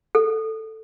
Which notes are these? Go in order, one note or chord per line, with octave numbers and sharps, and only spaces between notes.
A4